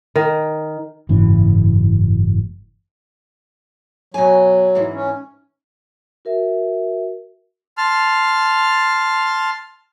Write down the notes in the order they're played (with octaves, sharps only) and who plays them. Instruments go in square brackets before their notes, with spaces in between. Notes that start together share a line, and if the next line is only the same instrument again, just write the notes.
[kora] D#3
[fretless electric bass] F#1 G#2 E3 C#4
[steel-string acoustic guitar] B2 G#5 [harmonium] F#3
[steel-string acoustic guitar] G#2 E3
[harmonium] C#4
[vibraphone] F#4 A#4 E5
[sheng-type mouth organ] A5 C6 F6